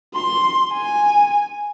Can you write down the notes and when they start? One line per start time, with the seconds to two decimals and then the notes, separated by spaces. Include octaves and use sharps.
0.15 C6
0.73 G#5